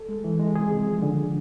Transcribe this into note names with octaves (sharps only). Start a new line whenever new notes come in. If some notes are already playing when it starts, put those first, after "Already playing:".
Already playing: A4
G#3
E3
G#3
C2 G#4
C3
F3
D3